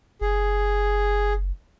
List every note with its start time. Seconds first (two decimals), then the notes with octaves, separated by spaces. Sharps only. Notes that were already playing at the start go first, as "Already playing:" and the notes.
0.21 F#1 G#4